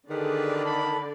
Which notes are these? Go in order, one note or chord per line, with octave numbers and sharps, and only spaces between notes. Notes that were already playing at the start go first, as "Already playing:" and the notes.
D3 D#3 G4 G#4 B4 D5
A5 B5